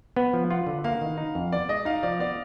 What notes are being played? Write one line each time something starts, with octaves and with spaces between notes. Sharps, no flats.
B3 B4
F3
F4 F#5
D3
A#3 F5
D#3
D#4
F2
B3 D5
G#3 D#5
D#4 F5
F3 D5
B3 D5